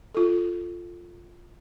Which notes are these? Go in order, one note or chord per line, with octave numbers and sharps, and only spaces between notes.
F4 A4